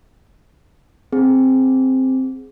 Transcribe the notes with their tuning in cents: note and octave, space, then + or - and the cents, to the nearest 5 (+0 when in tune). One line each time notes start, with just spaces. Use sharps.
C4 +0 G#4 +0